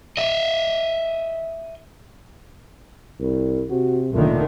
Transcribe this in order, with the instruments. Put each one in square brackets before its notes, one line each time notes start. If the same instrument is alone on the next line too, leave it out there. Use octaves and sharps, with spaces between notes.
[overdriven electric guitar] D#5 E5
[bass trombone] C2
[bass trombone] C3 [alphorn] F#4
[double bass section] F1 D3 D#3 [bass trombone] A#2 [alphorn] A3